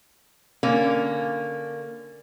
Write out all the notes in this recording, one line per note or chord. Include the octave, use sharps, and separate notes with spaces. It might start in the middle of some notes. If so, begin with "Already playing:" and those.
D3 A#3 C#4